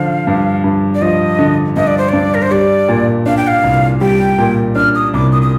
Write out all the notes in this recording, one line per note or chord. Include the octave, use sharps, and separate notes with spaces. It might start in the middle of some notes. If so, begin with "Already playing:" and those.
Already playing: D3 F3 F5
G2
G2
D5
F3 D#5
D3
G2 D#5
D5
C5
G2 D5
A#4
C5
G3 D5
A#2
D4 F5
G5
F5
C2
G3 G5
A#2
D4 F6
D#6
C2 D6
D#6
D#6